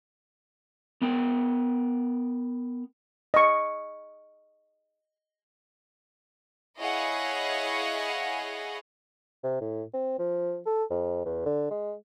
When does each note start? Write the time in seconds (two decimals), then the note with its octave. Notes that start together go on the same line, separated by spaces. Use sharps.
1.02 B3 A#4 G5
3.34 D#5 C#6
6.80 E4 G#4 C#5 D#5 F5 F#5
9.43 C3
9.61 A2
9.94 C4
10.19 F3
10.66 A4
10.90 F2
11.25 E2
11.46 D3
11.70 G#3